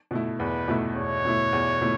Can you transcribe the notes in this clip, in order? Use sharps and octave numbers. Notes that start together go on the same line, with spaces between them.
B2 A3 E4
E2 B4
B2 A3 E4
E2 C#5
B2 A3 E4
E2
B2 A3 E4